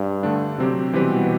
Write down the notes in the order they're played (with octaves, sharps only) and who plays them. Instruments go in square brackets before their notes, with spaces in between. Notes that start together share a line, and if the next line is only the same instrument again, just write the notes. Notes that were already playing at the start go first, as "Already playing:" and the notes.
Already playing: [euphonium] G2
[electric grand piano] D3 A3 D4
C3 F#3 C4 G4
[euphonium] B2 [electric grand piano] E3 G3 C4 G4 B4